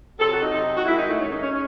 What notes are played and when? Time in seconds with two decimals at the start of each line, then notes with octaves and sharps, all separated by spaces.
0.18 C3 F#3 A4
0.29 F#4
0.41 D#4
0.51 C3 F#3
0.75 F#4
0.85 G#2 D#3 G#3 E4
0.96 D#4
1.07 A3
1.18 G#2 D#3 G#3 C#4
1.29 D#4
1.40 C#4
1.52 G#3 C#4